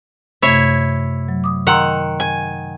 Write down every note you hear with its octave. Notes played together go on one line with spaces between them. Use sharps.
F#2 C3 A3 E4 C#5
F#3
D6 D#6
D#3 F#5 A#5 C6 E6
G#5